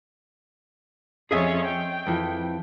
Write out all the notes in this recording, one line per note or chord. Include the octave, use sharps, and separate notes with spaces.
F2 C#4 G#4 C#5 D#5 E5
G5
F2 E3